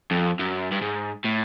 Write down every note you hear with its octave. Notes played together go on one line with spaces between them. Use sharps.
F2
F#2
G2
G#2
A2